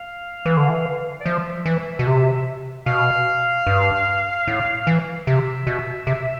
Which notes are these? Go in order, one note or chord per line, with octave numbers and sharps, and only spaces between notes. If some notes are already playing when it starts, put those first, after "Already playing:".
Already playing: F5
E3
D3
E3
D5
F3 E5
E3
B2
C3
B2 F5
G2
A2
E3
C3 E5
B2
C3